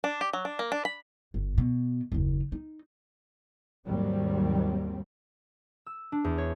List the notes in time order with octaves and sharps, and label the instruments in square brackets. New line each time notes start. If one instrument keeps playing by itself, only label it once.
[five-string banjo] D4
G4
F#3
D4
A#3
D4
B5
[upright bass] G1
B2
F#1 D#2
D#4
[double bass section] D#2 G#2 F#3 G3 C4
[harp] E6
D4
E2
C#5